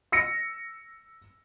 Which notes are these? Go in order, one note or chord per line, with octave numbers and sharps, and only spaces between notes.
E6 A#6 C#7